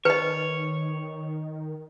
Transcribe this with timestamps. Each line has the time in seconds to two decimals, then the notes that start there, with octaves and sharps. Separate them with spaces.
0.05 D#3 B4 C#5 D#5